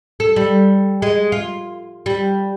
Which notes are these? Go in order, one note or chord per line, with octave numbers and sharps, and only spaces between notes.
A4
G3
G#3
F4
G3